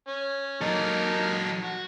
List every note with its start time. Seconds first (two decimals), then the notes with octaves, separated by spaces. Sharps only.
0.08 C#4
0.61 F#3 A#3 D#4 A4
1.63 F#4